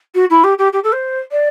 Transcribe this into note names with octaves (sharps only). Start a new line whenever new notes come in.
F#4
E4
G4
G4
G4
A4
C5
D5